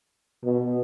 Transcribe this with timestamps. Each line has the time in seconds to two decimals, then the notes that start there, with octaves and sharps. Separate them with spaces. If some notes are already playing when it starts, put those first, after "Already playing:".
0.45 B2